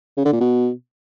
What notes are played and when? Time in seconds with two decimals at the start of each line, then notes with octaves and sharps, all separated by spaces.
0.17 C#3
0.25 D3
0.33 A#2
0.41 B2